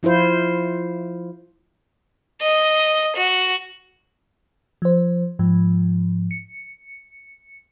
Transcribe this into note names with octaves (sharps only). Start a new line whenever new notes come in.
F3 E4 F4 C5
D#5
F#4
F3 C5
G#2 F3
C#7